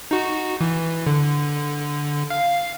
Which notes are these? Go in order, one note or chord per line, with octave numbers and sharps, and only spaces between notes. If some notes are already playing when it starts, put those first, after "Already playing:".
D#4 F#4
E3
D3
F5